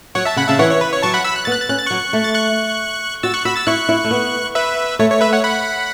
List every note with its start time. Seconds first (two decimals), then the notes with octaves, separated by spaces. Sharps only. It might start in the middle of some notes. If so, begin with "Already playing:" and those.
0.15 F#3 C#5 F#5
0.25 E5 A5
0.36 C#3 F#5 B5
0.48 C#3 E5 A5
0.59 E3 C#5 F#5
0.71 C#5
0.81 B4
0.92 C#5
1.02 F#3 A5 C#6
1.14 F#5 B5
1.24 B5 E6
1.36 F#6
1.45 B3 A6
1.52 F#6
1.61 A6
1.69 C#4 F#6
1.78 A6
1.86 F#3 C#6 F#6
2.13 A3
2.24 A6
2.35 C#6 F#6
3.23 F#4 E6 A6
3.34 C#6 F#6
3.45 F#4 B5 E6
3.56 E6 A6
3.67 E4 C#6 F#6
3.89 E4
4.04 A3
4.11 B3
4.55 B4 E5
4.99 A3 C#5
5.10 C#5
5.21 B4 E5
5.33 C#5 F#5
5.44 F#5 B5